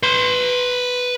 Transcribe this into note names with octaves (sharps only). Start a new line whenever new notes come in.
B4 C6